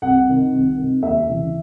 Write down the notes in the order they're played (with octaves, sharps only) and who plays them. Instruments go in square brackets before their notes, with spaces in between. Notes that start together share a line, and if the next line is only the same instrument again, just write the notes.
[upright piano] C2 F#5
C3 D#3
C2
C3 D#3
D#2 E5
C#3 E3